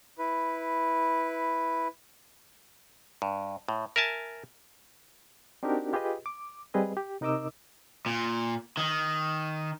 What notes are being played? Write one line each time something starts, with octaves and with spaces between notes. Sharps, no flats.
E4 B4
G2
A2
A#4 E5 G#5 A5
C4 D4 D#4 F#4 G4 A#4
F4 G4 G#4 B4 D#5
D6
G3 C4 G#4 B4 D#5
G4
C3 D#4 A#4 D#5 D6 E6
A#2
D#3